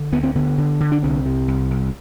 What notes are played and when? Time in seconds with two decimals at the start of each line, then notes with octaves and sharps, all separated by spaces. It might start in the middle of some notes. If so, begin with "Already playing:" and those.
Already playing: D3
0.12 D2 B3
0.23 C4
0.35 D3 B3
0.58 D3
0.80 D3
0.92 D4
1.03 C2 C4
1.26 C3
1.48 C2
1.71 C2